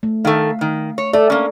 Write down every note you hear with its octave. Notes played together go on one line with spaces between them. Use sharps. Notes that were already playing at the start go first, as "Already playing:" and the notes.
A3
D#3 A3 F5
D#3
C#5
A3 A4 D5
A#3 C#4